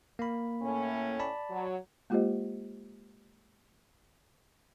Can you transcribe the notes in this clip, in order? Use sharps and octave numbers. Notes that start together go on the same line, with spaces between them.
A#3 B5
A2 C#4
D5 A5 B5
F#3
G#3 A#3 F4 G4 C5 D#5